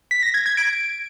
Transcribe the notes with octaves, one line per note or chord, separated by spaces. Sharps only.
B6
A#6
G#6
G#6
D7